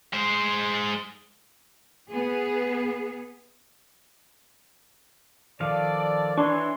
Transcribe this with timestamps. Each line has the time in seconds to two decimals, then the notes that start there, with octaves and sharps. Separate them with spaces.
0.13 G#3 C5
2.10 B3 G#4
5.60 D#3 F3 A4 D5 F5
6.38 E3 D4 C#5 C6 C#6